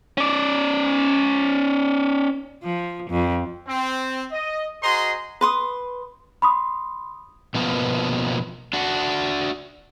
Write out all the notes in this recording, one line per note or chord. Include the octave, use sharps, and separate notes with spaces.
C#4 D5
F3
F2
C4
D#5
F#4 G#4 C5 D#5 A#5 C6
B4 C6 D#6
B5 C6 D#6
B2 F3 A#3 B3
D4 F#4